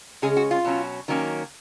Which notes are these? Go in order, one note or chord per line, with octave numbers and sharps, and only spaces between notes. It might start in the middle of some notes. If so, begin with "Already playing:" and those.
C#3 G#3 C#4 G#4
F#4
F4
B2 F#3 C#4
D#3 F#3 A#3 C#4